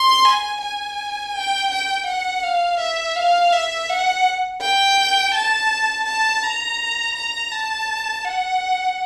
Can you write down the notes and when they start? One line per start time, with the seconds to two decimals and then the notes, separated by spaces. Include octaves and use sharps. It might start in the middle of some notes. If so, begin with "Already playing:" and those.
Already playing: C6
0.25 G#5
0.62 G#5
1.34 G5
1.70 G5
2.07 F#5
2.43 F5
2.80 E5
3.15 F5
3.52 E5
3.89 F#5
4.61 G5
5.34 A5
6.06 A5
6.43 A#5
7.15 A#5
7.52 A5
8.25 F#5